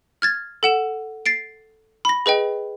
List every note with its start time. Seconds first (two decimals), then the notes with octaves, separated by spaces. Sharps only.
0.22 F6 G#6 A6
0.63 A4 F#5 E7
1.26 A6 C7 D7
2.05 B5 A#6
2.26 G#4 B4 D#5 G5